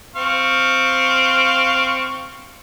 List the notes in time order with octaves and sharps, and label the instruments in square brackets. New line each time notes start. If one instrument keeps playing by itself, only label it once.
[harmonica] C4 F5 C#6